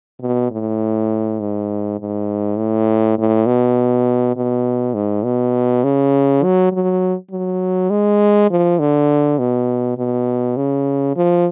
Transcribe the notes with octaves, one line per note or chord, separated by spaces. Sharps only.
B2
A2
G#2
G#2
A2
A2
B2
B2
G#2
B2
C#3
F#3
F#3
F#3
G#3
F3
D3
B2
B2
C#3
F3